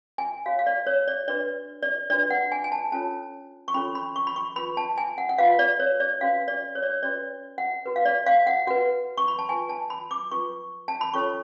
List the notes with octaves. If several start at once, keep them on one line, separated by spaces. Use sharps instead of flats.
G#5
F#4 C#5 F5
F5
D5
C#5
D5
D4 F#4 B4 D5
D5
D4 F#4 B4 D5
F#5
G#5
G#5
A5
C#4 F4 A4 C#5 A5
C#6
C#4 F4 A4 C#5 B5
B5
C#6
B5
C#6
F4 B4 B5
A5
G#5
F#5
F#5
F4 B4 F5
D5
C#5
D5
C#4 F#4 B4 F5
D5
C#5
D5
C#5
C#4 F#4 B4 D5
F#5
F#4 B4
F5
D5
F5
F#5
F#4 B4 F#5
C#6
B5
A5
F4 B4 G#5
A5
B5
D6
F4 B4 C#6
A5
B5
C#4 F4 A4 C#5 C#6